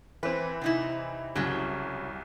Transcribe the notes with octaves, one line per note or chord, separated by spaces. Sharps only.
E3 C4 B4
C3 D#4 E4
C2 C#3 F#3